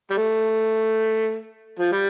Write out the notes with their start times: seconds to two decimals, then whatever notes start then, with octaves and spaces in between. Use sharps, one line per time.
0.11 G3
0.18 A3
1.80 F3
1.92 G3